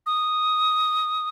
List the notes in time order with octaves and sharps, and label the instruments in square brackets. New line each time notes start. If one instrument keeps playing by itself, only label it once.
[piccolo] D#6